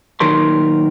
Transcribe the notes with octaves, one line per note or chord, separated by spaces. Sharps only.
A#2 D#3 F#3 A#4 C6